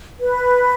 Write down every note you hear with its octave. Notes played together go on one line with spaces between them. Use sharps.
B4